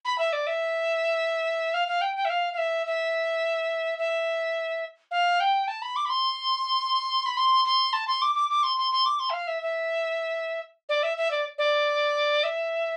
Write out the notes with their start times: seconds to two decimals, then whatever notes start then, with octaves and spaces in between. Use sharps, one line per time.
0.04 B5
0.18 E5
0.32 D5
0.46 E5
1.73 F5
1.88 F5
2.01 G5
2.16 G5
2.24 E5
2.29 F5
2.53 F5
2.57 E5
2.86 E5
3.98 E5
5.11 F5
5.40 G5
5.67 A5
5.82 B5
5.96 D6
6.05 B5
6.09 C6
7.25 B5
7.37 C6
7.64 C6
7.93 A5
8.07 C6
8.21 D6
8.35 D6
8.49 D6
8.63 C6
8.77 C6
8.91 C6
9.05 D6
9.19 C6
9.29 E5
9.33 F5
9.47 E5
9.62 E5
10.89 D5
11.02 E5
11.17 E5
11.30 D5
11.58 D5
12.43 E5